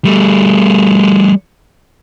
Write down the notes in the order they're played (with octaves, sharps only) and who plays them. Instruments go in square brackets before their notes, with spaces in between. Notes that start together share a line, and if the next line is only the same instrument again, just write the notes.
[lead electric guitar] G3 A3